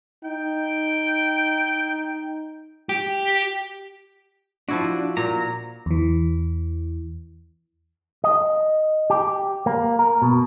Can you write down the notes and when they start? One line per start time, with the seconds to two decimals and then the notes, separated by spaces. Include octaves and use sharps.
0.24 D#4 G5
2.89 G4
4.69 F3 D4 E4 F#4
5.17 A#2 A#5
5.86 E2 E3
8.24 D#5
9.10 G4
9.66 A#3
9.99 A#4
10.22 B2